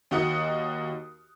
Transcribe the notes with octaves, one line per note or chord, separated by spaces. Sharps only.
D#2 D#4 F#4 D#5 D#6 C#7